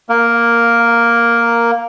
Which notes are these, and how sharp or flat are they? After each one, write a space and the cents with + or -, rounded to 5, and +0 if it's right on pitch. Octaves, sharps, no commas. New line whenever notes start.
A#3 +0 A#4 +0